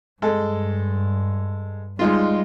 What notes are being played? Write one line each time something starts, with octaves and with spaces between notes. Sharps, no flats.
G2 G#3 A4
G3 G#3 D#4 F4